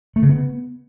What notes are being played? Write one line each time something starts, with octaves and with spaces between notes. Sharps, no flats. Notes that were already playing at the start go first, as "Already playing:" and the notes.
A3
C#3
B3